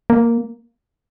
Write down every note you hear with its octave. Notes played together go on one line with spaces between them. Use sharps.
A#3